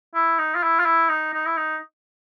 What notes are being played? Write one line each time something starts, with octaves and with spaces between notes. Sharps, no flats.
E4
D#4
F4
E4
F4
E4
D#4
D#4
E4
D#4